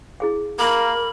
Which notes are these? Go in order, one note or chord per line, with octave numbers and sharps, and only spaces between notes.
E4 G#4 F5
A#3 A#4 B5